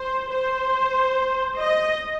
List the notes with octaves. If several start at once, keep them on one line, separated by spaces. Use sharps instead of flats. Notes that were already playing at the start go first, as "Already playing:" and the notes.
Already playing: C5
C5
D#5